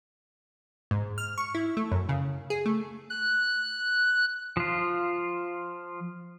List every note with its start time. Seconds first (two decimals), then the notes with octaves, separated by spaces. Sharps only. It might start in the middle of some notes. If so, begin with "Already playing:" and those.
0.91 G#2
1.18 F6
1.38 C#6
1.55 E4
1.77 A3
1.92 F#2
2.09 C#3
2.50 G#4
2.66 A3
3.10 F#6
4.57 F3 F4